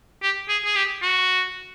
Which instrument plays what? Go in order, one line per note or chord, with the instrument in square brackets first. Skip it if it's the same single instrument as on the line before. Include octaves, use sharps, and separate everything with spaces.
[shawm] G4
G#4
G#4
G4
F#4